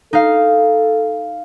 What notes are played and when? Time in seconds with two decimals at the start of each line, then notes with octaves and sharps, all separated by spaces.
0.13 D#4 A4 F5